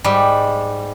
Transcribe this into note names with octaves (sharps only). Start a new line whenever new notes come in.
G#2 G3